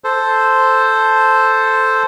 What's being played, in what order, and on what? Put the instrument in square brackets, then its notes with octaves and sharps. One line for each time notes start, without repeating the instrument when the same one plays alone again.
[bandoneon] A4 C5